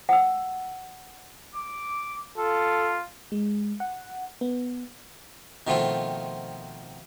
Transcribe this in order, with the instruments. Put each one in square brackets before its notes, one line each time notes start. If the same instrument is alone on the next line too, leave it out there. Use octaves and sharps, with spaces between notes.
[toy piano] F#5 E6
[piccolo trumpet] D6
[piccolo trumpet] F4 [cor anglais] A4
[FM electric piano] G#3
F#5
B3
[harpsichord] B2 D#3 F3 A3 C4 F4